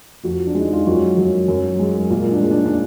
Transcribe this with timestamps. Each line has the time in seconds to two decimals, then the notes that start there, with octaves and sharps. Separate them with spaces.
0.24 F2 F#4
0.47 D4
0.55 G#3 D#4
0.73 F4
0.87 F#2 F#4
1.17 F#3
1.48 F#2
1.79 G#3
2.10 A#2
2.32 D4
2.41 G#3
2.51 D4
2.66 D4